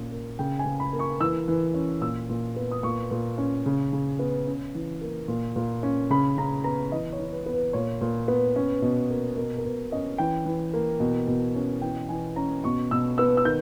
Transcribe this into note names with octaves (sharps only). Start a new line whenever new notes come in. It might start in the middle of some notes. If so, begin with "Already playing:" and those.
Already playing: A#2 C#4
A#3
C#3 G5
G#5
C#3
B5
A#3
C#6
E3 E6
E3
C#4
A#2 E6
A#2
B3
D#6
A#2 C#6
A#2
C#4
C#3
C#3
B3
C#4
E3
A#3
A#2
A#2
C#4
C#3 B5
C#3 A#5
B3 A#5
E3 D#5
C#5
E3
B4
B3
B4
A#2 C#5
A#2
B3
C#4
B2
A#3
B2 A#4
A#4
B2 B4
C#4 D#5
E3 G5
E3
A#3
B2
B2
C#4
E3 G5
E3 G#5
C#4 A#5
B2 C#6
B2 E6
B3 E6
E6
D#3 G6